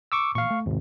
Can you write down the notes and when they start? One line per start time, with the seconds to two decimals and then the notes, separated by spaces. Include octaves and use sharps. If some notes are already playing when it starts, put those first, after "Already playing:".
0.12 C#6 D6 E6
0.35 A1 A#2 F5 C#6
0.51 A3
0.66 G#1 D#2 C3